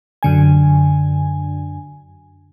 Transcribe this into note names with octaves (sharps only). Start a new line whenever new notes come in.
F#2 D3 G#5